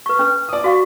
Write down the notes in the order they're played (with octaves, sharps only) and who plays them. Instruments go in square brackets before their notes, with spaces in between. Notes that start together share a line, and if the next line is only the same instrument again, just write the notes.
[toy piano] B4 C#6
C#4 B4
[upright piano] D5 D#6
[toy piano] F#4 F5 C#6